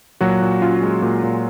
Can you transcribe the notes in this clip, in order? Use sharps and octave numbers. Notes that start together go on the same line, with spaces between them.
A#2 F#3 F#4
A#2
C#4 F4
G#3
A#2
A#2